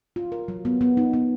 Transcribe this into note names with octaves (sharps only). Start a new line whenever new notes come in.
F4
A#4
F#3
B3
B3
D#4
B3